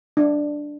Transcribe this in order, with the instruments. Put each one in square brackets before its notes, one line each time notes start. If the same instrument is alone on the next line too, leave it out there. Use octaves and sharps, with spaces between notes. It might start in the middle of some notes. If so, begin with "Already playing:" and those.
[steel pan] D4